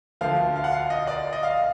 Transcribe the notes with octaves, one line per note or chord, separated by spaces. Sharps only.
D2 D3 F3 F5
F5
F#5
F5
D#5
D5
D#5
F5